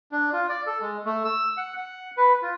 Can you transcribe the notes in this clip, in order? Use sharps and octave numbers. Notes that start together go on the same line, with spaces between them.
D4
F4
D5
A4
G#3
A3
E6
F#5
F#5
B4
F4